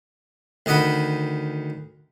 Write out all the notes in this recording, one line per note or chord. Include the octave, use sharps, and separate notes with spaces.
D2 D#3 D#5 F#5 B5